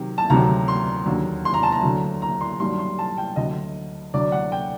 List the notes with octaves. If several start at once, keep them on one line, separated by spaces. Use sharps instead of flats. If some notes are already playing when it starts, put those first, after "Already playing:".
Already playing: C3 D#3 F#3
A5
D2 C3 D#3 F#3 A#5
C6
D#2 D3 F#3
C6
A#5
A5
A#5
D2 D3 F#3
A#5
C6
G2 D#3 F#3 C6
C6
A5
G5
D2 D3 F#3 D#5
D2 D3 F#3 D5
F#5
G5